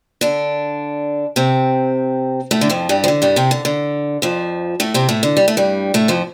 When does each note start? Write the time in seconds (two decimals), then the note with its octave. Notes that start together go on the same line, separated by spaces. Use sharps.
0.21 D3 D4
1.36 C3 C4
2.51 A2 A3
2.61 D3
2.70 F2 F3
2.89 G2 G3
3.04 F3
3.08 D3
3.22 G2 G3
3.36 C3 C4
3.51 D3
3.65 D3
4.22 F2 F3
4.80 A2 A3
4.94 C3 C4
5.09 A2 A3
5.23 D3
5.37 G3
5.48 A3
5.57 G2 G3
5.94 A2 A3
6.08 F2 F3